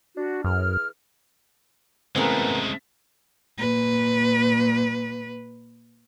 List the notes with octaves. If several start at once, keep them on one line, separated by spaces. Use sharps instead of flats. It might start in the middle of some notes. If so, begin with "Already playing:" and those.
D4 F#4
F#2 E3 G#4 F6
A2 C#3 E3 G#3 A3 B3 C4 A#4
A#2 B4